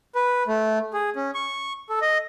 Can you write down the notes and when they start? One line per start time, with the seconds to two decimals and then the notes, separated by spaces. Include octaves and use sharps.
0.15 B4
0.47 A3
0.94 G#4
1.16 C#4
1.35 C#6
1.89 A4
2.01 D#5